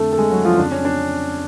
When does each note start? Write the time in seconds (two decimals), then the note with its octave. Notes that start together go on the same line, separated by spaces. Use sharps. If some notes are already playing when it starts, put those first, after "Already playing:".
Already playing: F2 D3 A3 A4
0.13 A4
0.18 G#3 G#4
0.31 F#3 F#4
0.45 F3 F4
0.58 F2 C#3 D4
0.71 C#4
0.85 D4